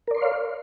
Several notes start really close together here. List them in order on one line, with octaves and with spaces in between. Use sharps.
A#4 D5 C6 C#5 F5